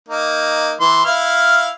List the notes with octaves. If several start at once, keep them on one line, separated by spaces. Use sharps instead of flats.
A#3 D#4
E3 C6
E4 F5 F6